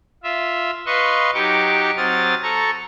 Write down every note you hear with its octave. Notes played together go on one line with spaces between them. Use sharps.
F4 E5
B4 D#5 F5 C6 C#6
F#3 D#4 G4 C#6 D6
F#3 C4 D#6 F6 A6
A4 A#5 C#6